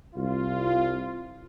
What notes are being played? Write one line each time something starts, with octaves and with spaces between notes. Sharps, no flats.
C2 F4